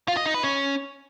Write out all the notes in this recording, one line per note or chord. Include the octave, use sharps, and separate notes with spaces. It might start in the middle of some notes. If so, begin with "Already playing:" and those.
F4
D#5
D#4
B4
C#4